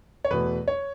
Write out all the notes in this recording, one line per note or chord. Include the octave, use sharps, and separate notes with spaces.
C#5
E2 B2 A3 B4
C#5